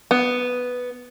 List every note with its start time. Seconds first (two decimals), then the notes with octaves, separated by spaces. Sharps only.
0.11 B3